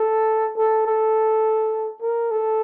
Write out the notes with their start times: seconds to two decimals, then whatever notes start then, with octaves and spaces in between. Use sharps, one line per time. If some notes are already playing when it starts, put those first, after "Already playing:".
Already playing: A4
0.57 A4
0.86 A4
2.01 A#4
2.31 A4